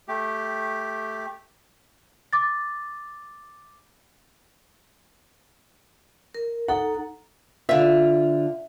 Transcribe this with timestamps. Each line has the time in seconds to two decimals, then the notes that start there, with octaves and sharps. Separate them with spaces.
0.08 A3 G4
2.33 D6 A6
6.35 A#4
6.68 D#4 A4 F#5 A#5
7.69 D3 F4 E5